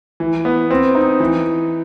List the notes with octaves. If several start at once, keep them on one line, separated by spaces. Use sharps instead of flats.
E3
B3
C4
D#4
E3